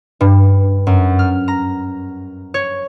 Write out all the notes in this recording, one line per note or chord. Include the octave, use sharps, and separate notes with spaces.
G2
F#2
F6
A#5
C#5